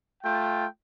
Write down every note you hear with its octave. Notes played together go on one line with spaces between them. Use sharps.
A3 F4 G5